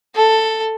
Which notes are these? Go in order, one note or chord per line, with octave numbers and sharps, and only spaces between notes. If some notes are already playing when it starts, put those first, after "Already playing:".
A4